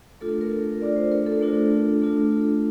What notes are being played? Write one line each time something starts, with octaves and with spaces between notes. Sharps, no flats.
A3 D4 F4 A4
A#4
A3 D4 F4 D5
C5
A#4
A4
A3 D4 F4
A3 D4 F4